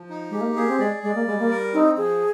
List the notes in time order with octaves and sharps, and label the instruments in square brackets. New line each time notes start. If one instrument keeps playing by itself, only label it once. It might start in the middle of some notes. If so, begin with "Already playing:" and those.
Already playing: [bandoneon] F3
D#4
[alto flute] G#3 [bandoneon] G4
[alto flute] A#3
[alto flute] A#3 [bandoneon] G#4
[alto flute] C4
[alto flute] G#3 [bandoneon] D5
[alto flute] G#3 [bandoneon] D5
[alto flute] A#3
[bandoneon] G3 [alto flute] G#3
[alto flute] A#3
[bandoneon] A#4
[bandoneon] C4 [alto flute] D#4
[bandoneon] F3 [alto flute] G#4